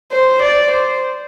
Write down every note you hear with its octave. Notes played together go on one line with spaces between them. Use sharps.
C5
D5
C5